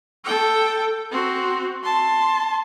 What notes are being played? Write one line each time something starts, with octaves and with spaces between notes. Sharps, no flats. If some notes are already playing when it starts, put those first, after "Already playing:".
A4 G5
C4 F#4
A5 C6